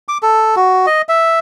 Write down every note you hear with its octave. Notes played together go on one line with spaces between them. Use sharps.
D6
A4
F#4
D#5
E5